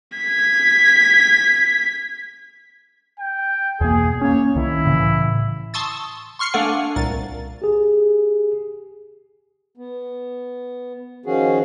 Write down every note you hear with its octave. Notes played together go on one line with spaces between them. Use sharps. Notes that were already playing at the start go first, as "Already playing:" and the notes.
G#6 B6
G5
E2 B2 A#3 G#4
A#3 C#4 C#5
C2 D#3 E4
A2 C#3 E3
A5 C6 C#6 D#6 E6 A6
C6 C#6 F6 C7 C#7
A3 D4 A4 F5 F#5 G#5
C2 A#2 A6
G4 G#4
B3
D#3 F3 C#4 F#4 G#4